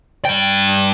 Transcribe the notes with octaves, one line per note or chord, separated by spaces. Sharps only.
G2 G5